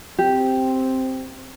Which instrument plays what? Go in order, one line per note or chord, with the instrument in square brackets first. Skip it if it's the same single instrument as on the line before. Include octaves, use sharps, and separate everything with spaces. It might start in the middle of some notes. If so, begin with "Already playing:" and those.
[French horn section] C4 [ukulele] G4